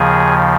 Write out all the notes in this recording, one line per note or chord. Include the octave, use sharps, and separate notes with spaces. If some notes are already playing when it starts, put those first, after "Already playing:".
Already playing: D#2 C#3 F3 G#4